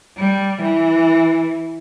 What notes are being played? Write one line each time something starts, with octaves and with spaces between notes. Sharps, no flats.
G3
E3